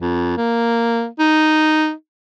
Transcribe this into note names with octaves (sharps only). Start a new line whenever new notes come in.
F2
A#3
D#4